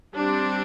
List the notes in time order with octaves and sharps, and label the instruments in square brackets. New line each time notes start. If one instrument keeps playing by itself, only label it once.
[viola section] G3 C4 D4